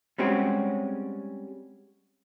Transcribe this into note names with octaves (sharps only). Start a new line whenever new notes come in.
G3 G#3 C4 C#4 F#4 G4